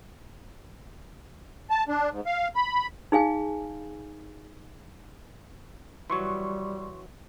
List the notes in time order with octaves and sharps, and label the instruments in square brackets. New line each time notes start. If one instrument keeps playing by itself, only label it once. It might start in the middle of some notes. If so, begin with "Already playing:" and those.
[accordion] A5
D4
G#2
F5
B5
[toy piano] D#4 G#4 F5 G#5
[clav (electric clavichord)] E3 F#3 [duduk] G3 [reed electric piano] C6 C#6